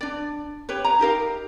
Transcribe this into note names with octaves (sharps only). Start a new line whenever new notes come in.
D4 D5
G4 B4 C#5
A#5
D#4 G4 A#4 F5